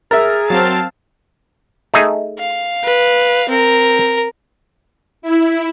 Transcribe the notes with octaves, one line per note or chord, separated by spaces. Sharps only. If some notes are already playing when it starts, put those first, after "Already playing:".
G#4 A#4 E5 A6
F#3 C4 F5 A5
A3 D#4 G#4
F5
B4
C4 A#4
E4